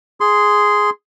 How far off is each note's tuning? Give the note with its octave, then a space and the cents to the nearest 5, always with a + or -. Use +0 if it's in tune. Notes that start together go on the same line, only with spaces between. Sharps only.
G#4 +0 C6 -10